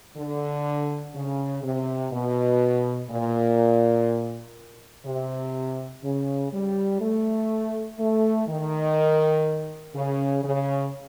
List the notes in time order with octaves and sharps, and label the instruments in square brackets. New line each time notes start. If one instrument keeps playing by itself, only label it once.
[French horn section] D3
C#3
C3
B2
A#2
C3
C#3
G3
A3
A3
D#3
C#3
C#3